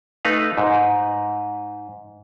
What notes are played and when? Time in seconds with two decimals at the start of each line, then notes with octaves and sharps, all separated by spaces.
0.25 A3 D#4 B4 F5
0.58 G#2